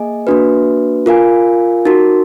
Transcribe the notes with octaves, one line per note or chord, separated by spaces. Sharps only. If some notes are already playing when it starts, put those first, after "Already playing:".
Already playing: A#3 G#4 D#5 G#5
A#3 D4 F#4 B4
F4 A#4 F5 G#5
D#4 F#4 A#4